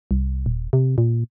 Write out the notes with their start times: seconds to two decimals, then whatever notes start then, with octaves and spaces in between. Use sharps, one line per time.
0.11 C2
0.46 D#1
0.73 C3
0.98 A#2